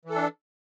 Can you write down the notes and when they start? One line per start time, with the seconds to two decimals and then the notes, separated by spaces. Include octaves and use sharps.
0.05 E3
0.10 A4
0.15 D4